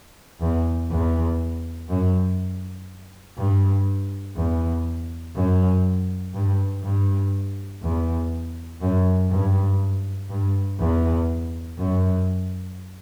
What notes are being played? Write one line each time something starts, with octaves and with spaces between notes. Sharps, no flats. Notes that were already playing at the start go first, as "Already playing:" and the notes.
E2
E2
F#2
G2
E2
F#2
G2
G2
E2
F#2
G2
G2
E2
F#2